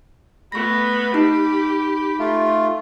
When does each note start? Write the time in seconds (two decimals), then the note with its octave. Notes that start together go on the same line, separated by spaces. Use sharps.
0.52 A3 B3 B5 C#6 A#6
1.14 D#4 G4
2.19 A3 F4